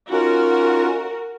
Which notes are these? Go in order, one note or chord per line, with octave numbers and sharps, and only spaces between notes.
C#4 D#4 F4 F#4 A#4